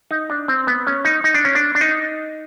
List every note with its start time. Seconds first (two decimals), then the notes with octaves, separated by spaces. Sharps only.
0.11 D#4
0.30 D4
0.48 C4
0.67 B3
0.87 C#4
1.05 D#4
1.24 D#4
1.34 D4
1.45 C#4
1.55 D4
1.75 D4
1.81 D#4